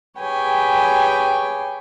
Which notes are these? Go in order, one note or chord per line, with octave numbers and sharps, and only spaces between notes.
G4 G#4 B4 C#5 G5 G#5